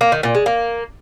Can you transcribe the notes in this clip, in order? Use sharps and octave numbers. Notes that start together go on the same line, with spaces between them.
A#3
D#3
A#2
G#3
A#3